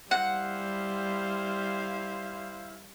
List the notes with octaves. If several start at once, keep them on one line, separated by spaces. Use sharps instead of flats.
G3 E4 C5 F5 F#5